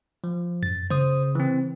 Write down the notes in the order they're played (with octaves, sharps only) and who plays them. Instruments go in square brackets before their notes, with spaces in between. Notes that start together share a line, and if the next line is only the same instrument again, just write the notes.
[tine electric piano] F3
[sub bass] F#2 [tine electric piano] A6
[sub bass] C#3 [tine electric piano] C5 D#6
[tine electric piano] E3 C4